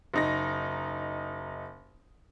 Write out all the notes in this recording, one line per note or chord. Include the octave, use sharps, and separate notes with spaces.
F#1 D#4 A#6